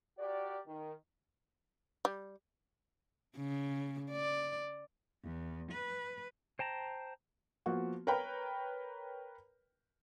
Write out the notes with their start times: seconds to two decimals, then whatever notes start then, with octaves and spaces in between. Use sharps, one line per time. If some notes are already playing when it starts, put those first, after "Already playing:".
0.18 F#4 G4 A#4 D5
0.67 D#3
2.05 G3
3.37 C#3
4.12 D5
5.24 E2
5.72 B4
6.59 C5 G5 A5 A#5
7.66 F3 A#3 B3 F#4
8.07 A#4 B4 C#5 G5 A#5 B5